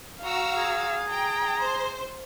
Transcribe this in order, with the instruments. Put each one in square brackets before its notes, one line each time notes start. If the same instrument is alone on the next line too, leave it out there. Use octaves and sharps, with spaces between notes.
[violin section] F#4 A#5 E6 [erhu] F5
[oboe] G#4
[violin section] G5 [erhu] A#5
[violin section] C5